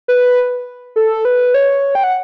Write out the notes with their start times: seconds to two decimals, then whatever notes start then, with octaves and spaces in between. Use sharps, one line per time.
0.08 B4
0.96 A4
1.25 B4
1.54 C#5
1.95 G5
2.04 F#5